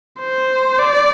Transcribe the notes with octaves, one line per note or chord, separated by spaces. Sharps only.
C5
D5